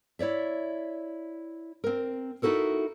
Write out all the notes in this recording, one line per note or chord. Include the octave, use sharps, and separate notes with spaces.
E4 C#5 D5 E5
C4 A#4
D#4 E4 F#4 A4 A#4